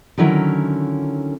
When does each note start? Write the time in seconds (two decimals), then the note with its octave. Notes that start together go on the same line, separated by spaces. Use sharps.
0.18 D3 D#3 F#3 C#4 E4 A#4